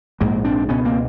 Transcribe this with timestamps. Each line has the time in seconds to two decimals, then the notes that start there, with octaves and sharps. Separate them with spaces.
0.20 A#1 G#2 G#3 A#3
0.44 C4 D4
0.69 C#2 B2 B3 C#4
0.85 A#3 C4